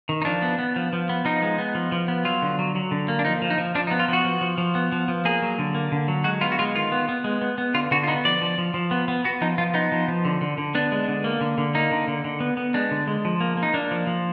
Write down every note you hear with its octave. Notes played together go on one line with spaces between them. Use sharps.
D#3
D#4
F3 D4
B3
B3
F3
F3
B3
F3 D#4
G#3
B3
F3
F3
B3
F#3 F4
D3
F#3
F#3
D3
A#3
D4
F3 D#4
F3
D#4
F3
F3 D4
D#4
B3
F4
F3 F#4
F3
F3
F3
B3
F3
F3
A#3 G#4
F#3
D3
A#3
D3
F#3
G#3 F#4
B3 F4
F#4
G#3 F4
D#3 F4
B3
B3
G#3
B3
B3
D3 F4
D3 F#4
F4
B3 D#4
F3 D5
F3
F3
F3
B3
B3
B3 F#4
F3 D#4
F3 F4
B3 D#4
F3
F3
D3
D3
D3
B3 D4
G#3
D3
A#3
D3
D3
A#3 D#4
D3
D3
D3
B3
B3
G#3 D4
D3
G#3
F3
A#3
A#3
D#4
A#3 D4
F3
F3